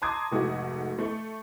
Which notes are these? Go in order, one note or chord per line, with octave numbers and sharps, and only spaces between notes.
A5 A#5 C6 D6 D#6 G#6
F1 G#2 A3 F#4
A3 C#6